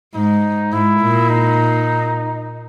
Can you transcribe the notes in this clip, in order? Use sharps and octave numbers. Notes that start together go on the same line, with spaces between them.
G#2 D#4
G#2 E4
A#2
D#4